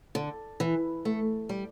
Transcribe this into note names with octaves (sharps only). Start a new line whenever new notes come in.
D3
E3
A3
G3